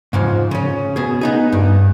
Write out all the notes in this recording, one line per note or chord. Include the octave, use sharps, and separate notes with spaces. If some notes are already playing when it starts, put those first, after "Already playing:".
G#2 C#3 F3
C#3 C#4
B2 G#4
B3 D#4 G#4
G2